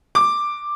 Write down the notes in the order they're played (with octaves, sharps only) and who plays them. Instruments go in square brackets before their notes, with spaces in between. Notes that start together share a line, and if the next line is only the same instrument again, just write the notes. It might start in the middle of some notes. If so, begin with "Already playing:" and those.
[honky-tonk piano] D6